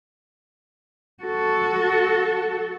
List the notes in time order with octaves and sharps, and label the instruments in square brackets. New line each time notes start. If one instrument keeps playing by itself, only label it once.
[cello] F#4 A4